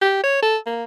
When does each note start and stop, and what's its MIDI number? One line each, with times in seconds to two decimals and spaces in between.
0.01 0.20 67
0.24 0.39 73
0.42 0.57 69
0.66 0.84 58